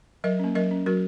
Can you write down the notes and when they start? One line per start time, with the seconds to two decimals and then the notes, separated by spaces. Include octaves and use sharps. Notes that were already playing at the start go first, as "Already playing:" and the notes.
0.24 F#3 A#4 D#5
0.39 A#3 C#4
0.55 F#3 A#4 D#5
0.71 C#4
0.86 F#3 F#4 A#4